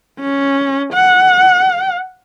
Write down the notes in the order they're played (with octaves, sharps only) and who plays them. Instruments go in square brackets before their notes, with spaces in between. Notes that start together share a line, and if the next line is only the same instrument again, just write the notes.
[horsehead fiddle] C#4
F#5